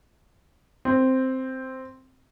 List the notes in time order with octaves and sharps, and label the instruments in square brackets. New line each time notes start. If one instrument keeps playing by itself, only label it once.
[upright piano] C4